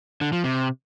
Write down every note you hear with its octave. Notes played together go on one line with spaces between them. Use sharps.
D3
F3
C3